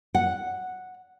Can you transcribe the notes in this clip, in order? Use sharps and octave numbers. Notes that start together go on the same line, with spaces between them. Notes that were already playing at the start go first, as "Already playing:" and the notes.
F#5